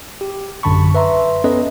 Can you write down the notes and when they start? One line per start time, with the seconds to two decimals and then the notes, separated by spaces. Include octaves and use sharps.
0.21 G4
0.63 A1 F#2 D3 A5 B5 C#6
0.94 B4 E5 A#5 C6
1.44 B3 C#4 A4 B4 D#5